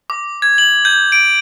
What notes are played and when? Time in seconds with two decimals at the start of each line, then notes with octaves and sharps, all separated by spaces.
0.10 D6
0.42 G#6
0.58 F#7
0.85 G6
1.12 D7